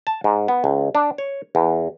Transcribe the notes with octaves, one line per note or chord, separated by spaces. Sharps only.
A5
G#2
B3
C#2
D4
C#5
E2